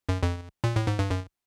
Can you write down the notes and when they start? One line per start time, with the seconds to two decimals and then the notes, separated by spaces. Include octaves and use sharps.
0.09 F#2
0.23 F2
0.64 A#2
0.76 A2
0.87 G#2
0.99 G2
1.10 F#2